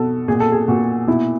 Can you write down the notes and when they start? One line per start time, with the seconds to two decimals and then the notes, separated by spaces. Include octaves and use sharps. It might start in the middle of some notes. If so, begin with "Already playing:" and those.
Already playing: B2 A4
0.28 A#2 G#4
0.40 A4
0.52 G#4
0.68 A#2 F#4
1.07 B2 E4